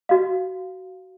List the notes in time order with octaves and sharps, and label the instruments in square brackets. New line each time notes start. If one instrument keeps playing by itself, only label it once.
[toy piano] F#4 F5